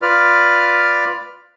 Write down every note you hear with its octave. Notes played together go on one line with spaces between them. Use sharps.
F4 B4 D5 F6